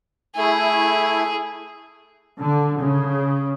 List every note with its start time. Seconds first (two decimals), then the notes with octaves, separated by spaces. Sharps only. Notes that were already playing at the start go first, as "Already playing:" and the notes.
0.36 A3 E4 G#4
2.39 D3
2.81 C#3